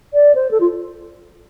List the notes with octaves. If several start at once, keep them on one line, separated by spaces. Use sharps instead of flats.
D5
C5
A4
F4